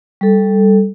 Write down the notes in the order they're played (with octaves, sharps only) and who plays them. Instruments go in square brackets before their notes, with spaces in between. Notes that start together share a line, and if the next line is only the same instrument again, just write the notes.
[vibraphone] G3 A4